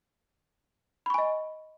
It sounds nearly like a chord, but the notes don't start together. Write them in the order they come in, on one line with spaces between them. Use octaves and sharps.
B5 C#6 G#5 D#5